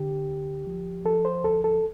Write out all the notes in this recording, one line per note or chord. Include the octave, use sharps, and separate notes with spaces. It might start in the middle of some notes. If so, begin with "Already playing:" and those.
Already playing: D3 G4
D2
F3
F3 A4
C5
D2 A4
A4